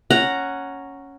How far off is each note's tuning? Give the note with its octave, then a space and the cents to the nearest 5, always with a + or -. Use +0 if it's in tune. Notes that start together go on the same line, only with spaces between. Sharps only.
C#4 +0 F#5 +0 A#5 +0